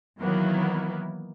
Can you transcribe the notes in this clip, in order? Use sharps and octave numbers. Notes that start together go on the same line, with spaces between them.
D#3 E3 F#3 A#3 B3 E4